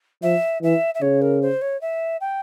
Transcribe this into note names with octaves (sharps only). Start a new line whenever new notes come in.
F3 E5
E3 E5
E5
C#3 C#5
A#4
C5
C#5
E5
G5